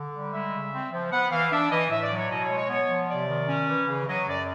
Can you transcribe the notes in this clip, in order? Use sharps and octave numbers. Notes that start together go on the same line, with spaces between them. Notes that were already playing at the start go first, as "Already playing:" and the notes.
Already playing: D3
G3
G#3 E5
C#3
C4
F3
B3 F#5
E3 F5
D4 E5
E3 D#5
A2 E5
D5
F#3
C#5
B2 D#5
C#5
G#3
C#5
B3 C#5
F3
C3 D5
D#3
C#4
E3
C#3
F#3 D#5
F#2 D5